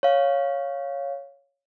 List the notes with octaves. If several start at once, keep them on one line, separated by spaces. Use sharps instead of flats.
C#5 F5